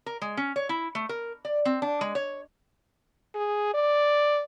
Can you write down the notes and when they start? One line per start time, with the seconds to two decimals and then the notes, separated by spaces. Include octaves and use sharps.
0.06 A#4
0.22 G#3
0.37 C#4
0.56 C#5
0.69 E4
0.95 A3
1.09 A#4
1.45 D5
1.65 C4
1.82 D4
2.01 G#3
2.15 C#5
3.35 G#4
3.74 D5